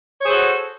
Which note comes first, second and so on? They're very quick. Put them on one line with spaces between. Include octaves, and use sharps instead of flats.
C#5 G#4 C5 A4 F#4